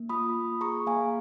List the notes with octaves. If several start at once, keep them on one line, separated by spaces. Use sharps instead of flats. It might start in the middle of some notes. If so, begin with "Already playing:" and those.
Already playing: A#3
F4 B5 D#6
A#3
G#4 A#5 C#6
A#3 F5 G#5